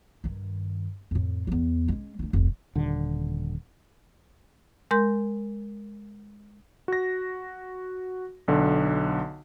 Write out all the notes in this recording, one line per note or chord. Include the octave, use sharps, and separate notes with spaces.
G2 D#3
F2 A2
E2 E3
G#3 C#4
A3 D4
F1 C2
D#1 D3
G#3 A#4 C6 G6
F#4 A#6
B1 D3